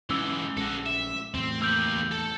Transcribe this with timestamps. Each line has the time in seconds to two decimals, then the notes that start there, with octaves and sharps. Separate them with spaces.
0.10 G#2 E3 C#4 D6 E6 G7
0.57 A#1 G#3 C#4 F#4 A4
0.86 E5 E7
1.34 E2 A2 C4
1.62 A#3 G4 E6 G6 F#7
2.11 A4 A5